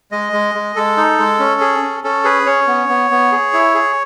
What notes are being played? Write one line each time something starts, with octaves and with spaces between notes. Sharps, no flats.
G#3 D#5
G#3
G#3
G#3 A4
D#4
G#3
C#4
G#4
C#4
C#4 A4
G#4 B4
C#4 C#5
B3
B3
B3
G#4
E4
G#4